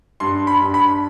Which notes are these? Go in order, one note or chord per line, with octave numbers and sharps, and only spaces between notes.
G2 C6
B5
G2
B5